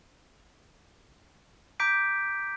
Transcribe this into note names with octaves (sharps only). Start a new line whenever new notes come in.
A#5 D6 G6 B6 D7